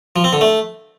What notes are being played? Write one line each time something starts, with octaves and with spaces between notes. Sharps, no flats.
F3
C4
D3
A3